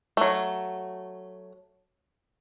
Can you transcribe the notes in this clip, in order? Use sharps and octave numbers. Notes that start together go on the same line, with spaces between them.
F#3 A3